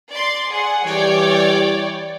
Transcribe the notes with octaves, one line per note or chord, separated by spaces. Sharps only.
D5 C6
G#4 F#5
E3 G3 C#5 D5 G5